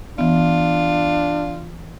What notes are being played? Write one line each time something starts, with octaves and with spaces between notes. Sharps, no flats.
E3 B3 D4 F4